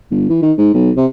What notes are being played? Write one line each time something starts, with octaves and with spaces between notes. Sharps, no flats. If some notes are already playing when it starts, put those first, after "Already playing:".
G1
E3
D#3
G#2
B1
C3